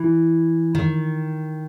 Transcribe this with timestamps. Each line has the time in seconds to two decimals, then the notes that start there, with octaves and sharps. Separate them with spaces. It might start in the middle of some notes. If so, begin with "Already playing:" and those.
Already playing: E3
0.75 D#3